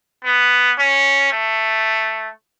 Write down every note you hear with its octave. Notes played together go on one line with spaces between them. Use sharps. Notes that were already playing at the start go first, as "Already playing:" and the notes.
B3
C#4
A3